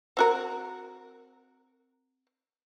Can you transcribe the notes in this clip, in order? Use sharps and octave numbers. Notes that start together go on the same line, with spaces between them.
C4 F#4 A#4